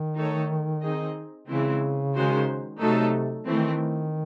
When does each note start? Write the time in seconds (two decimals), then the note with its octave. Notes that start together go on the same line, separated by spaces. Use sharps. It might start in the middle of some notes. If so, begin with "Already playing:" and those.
Already playing: D#3
0.16 A3 D#4 A4 C#5
0.82 C4 D#4 G#4 D#5
1.47 C#3 E3 G#3 C4 E4
2.14 D#3 G#3 C#4 F#4 C5
2.80 C3 F#3 A3 D#4 A4
3.46 D#3 E3 A3 C4